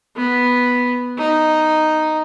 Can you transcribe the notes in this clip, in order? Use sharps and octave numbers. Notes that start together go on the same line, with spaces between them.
B3
D#4